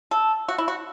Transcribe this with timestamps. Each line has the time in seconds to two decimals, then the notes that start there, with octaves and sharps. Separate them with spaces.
0.11 A4
0.48 F#4
0.58 E4
0.68 F#4